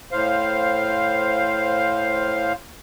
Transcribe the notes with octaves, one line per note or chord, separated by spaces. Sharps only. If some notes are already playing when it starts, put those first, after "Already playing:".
A2 C5 F5